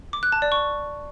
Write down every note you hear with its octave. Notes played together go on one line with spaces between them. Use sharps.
D6
F#6
A5
D5
C#6